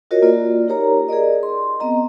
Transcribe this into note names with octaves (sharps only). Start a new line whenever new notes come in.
F4 F#4 A#4 C#5 D#5
A#3 F4 D5
D#4 G4 A#4 C#5 A#5
G#4 A#4 D5 D#5
C6
B3 C4 D#5 A#5